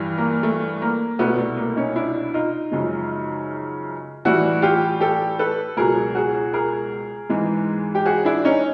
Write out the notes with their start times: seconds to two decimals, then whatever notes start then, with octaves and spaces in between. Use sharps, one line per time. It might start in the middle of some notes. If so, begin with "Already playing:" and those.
Already playing: G2 E3 G3
0.18 A#3
0.43 A3
0.82 A#3
1.19 C2 B2 G3 A3 B3
1.38 A3
1.57 A#3
1.76 C#4 D#4
1.96 D4 E4
2.34 D#4 F4
2.72 F#2 C#3 F3 G#3
4.25 A2 E3 G3 E4 F#4
4.62 F4 G4
5.01 G4 A4
5.39 A4 B4
5.77 C#2 B2 F#3 G#4 A#4
6.15 F#4 G#4
6.53 G#4 A#4
7.29 G#2 E3 G#3
7.95 G4
8.06 F#4 G#4
8.25 D4 E4
8.45 C#4 D#4